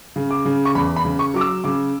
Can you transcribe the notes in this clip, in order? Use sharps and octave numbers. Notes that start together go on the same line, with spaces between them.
C#3
D6
C#3
C#6
E2 B5
B5
C#3
C#6
F#3 D6
E6
C#3 D6